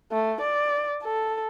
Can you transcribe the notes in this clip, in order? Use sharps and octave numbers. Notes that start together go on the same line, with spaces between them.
A3
D5
A4